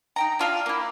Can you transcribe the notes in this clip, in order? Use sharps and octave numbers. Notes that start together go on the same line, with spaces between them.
D#4 G5 A#5
D4 F4 F5
A#3 E4